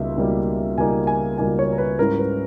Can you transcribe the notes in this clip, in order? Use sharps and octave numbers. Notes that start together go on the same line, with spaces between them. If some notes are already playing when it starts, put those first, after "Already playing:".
Already playing: C#2 B2 G3 A#3 D#4 E5
C#2 B2 G3 A#3 D#4
C#2 B2 G3 A#3 D#4 G#5
G#5
C#2 B2 G3 A#3 D#4 G#5
C#5
A#4
B4
G#2 G3 C#4 E4 A#4
B4